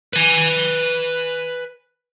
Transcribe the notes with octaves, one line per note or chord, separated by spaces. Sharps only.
B4 G#5